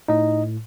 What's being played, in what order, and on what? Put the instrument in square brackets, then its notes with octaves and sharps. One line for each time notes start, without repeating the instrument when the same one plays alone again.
[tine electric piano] A2 D#4 D#5